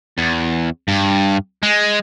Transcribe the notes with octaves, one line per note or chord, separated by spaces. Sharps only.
E2
G2
G#3